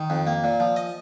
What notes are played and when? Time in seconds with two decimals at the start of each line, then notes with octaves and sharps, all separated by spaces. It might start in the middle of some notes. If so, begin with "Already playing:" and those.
Already playing: D#3
0.10 F2
0.27 A#3
0.44 A#2
0.60 F3
0.76 D#5